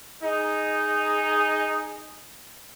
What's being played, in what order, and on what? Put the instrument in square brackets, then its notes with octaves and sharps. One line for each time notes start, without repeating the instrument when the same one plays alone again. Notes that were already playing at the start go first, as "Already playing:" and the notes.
[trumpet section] D#4 G#4